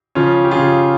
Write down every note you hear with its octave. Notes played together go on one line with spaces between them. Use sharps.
C#3 F3 C#4 F4
G4
C#3 F3 F4 G#4